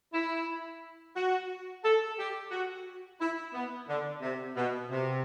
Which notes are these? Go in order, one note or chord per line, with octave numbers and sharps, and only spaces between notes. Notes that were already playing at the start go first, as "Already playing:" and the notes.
E4
F#4
A4
G4
F#4
E4
B3
D3
C3
B2
C3